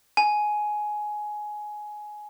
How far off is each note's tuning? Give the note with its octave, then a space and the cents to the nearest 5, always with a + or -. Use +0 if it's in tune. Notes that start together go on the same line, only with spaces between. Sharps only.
G#5 +15